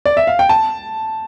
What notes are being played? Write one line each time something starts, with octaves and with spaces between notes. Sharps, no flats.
D5
E5
F5
G5
A5